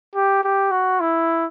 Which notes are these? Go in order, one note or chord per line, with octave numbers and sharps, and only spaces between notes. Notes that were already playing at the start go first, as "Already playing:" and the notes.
G4
G4
F#4
E4